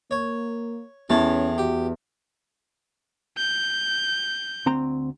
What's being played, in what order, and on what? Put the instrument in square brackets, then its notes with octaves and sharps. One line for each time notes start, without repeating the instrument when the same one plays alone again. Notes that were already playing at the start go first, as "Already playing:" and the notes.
[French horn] A#3 [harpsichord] C#5
[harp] E2 [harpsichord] A2 C#5 A5 [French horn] C#4
[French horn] F#4 [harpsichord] G4
[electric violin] G6
[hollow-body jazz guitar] D2 C4 A#5